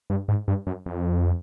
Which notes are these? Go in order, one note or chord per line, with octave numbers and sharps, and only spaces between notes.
G2
G#2
G2
F#2
F2